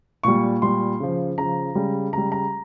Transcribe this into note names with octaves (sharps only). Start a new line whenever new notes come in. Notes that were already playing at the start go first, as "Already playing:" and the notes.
A#2 G3 C#6
A#2 G3 C6
C#3 F3
C#3 F3 A#5
C#3 G3
C#3 G3 A#5
A#5